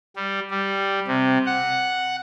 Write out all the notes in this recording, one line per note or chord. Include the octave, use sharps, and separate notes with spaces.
G3
G3
C3
F#5